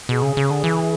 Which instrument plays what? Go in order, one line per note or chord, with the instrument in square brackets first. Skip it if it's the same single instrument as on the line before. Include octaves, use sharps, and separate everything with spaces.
[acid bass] B2 [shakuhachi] G#4
[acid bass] C#3
C#3
D3
E3